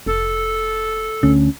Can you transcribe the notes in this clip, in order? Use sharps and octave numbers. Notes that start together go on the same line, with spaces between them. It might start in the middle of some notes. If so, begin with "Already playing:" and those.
F1 A4
D2 C#4